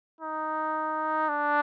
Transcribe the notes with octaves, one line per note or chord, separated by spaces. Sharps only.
D#4
D4